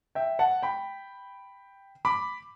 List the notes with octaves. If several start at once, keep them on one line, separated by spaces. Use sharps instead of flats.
E5 G5
F#5 A5
G5 B5
B5 D6